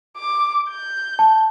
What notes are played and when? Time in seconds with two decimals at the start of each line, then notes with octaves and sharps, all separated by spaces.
0.17 D6
0.70 G6
1.19 A5